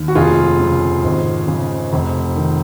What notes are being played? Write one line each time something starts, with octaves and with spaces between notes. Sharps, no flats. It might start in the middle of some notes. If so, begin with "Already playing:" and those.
Already playing: D#2
F#4
F1 F4 G#4
C#3
G#1
C#3
F1
D#3